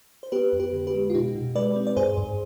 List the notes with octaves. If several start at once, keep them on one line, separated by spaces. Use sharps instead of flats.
C5
B3 G4 B4
F2
G4 B4
D3
G4 B4
G#3
F4
B2 D#4 G4
B2
G#3 B4 D5
C4
D5
G2 G#4 C5
G2